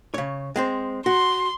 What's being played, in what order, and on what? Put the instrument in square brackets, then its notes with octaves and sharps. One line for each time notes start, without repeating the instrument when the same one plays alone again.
[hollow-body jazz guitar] C#3 C#5
G#3 C4 C5
[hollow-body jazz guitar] F#4 [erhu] C6